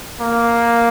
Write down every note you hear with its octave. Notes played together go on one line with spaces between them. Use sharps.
A#3